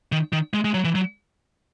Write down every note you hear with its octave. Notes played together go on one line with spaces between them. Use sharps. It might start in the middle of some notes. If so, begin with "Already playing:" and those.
D#3
D#3
G#3
G#3
F#3
E3
F#3